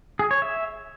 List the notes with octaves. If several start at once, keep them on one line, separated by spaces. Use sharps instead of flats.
G#4
C#5
E5